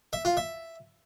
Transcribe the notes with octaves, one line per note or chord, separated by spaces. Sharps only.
E5
F4
E5